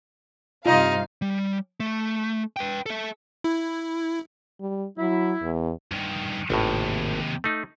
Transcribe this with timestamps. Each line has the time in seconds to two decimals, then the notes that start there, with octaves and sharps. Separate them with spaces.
0.66 G2 C3 D#4 F4 D#5 F5
1.22 G3
1.80 A3
2.56 B4 G5
2.86 A4 E5
3.44 E4
4.60 G3
4.98 F#3 E4
5.42 E2
5.92 G2 D#3
6.50 G#1 D#2 A2 C3
7.44 A3 D#4